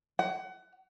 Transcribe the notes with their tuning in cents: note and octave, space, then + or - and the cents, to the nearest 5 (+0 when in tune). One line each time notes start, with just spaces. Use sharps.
F#5 +30